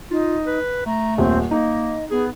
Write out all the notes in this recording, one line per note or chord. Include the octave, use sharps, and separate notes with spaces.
D#4 F4
B4
A3 A#5
D#1 C4
A#3 D#4 D#5
B3 G#4